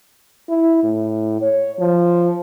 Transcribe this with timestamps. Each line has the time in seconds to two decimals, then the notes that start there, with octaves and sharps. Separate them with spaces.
0.49 E4
0.83 A2
1.41 C#5
1.79 F3